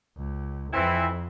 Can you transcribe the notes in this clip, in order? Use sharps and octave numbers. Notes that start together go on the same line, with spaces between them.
C#2
F2 E3 C4 E4